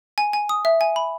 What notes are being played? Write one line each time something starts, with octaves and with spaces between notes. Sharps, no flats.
G#5
G#5
D#6
E5
G#5
B5